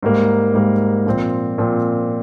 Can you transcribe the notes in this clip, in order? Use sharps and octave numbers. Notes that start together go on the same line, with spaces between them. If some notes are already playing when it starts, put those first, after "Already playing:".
G#2 G3 A#3
G#2 G3 A#3
A#2 F3 C4
A#2 F3 C4